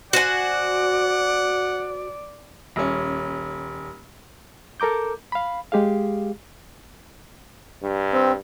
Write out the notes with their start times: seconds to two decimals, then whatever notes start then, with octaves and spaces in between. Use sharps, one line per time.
0.13 F#4 C5 D5 F#5 G#5
2.76 D#1 C#4
4.80 A4 A#4 A#5 D6 G6
5.32 F5 B5
5.72 G#3 G4 G#4 F5
7.83 G2
8.13 C4